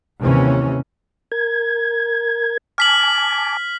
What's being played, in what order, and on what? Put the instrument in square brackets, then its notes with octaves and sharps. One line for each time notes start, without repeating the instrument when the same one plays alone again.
[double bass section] D#2 C3 E3 C#4
[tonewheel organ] A#4 G#6
[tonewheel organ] G#5 A5 D6 [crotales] F6 B6 F#7